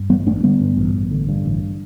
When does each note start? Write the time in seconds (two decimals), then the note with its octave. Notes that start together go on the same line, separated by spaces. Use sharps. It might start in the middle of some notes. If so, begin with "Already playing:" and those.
Already playing: G2
0.10 A1 G3 B3
0.26 A1 A3 D4
0.43 D3 G3 B3
0.60 G2
0.77 A1
0.94 A1
1.11 D3
1.29 G2
1.46 A1